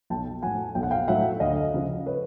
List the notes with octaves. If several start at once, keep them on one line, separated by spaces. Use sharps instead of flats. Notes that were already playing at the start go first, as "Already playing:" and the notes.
B1 G5 A5
A2 F#3 F#5 G#5
B1 G5
F#5
F5 G5
A2 F#3 E5 F#5
D2 D#5 F5
C#3 F3
B4 C#5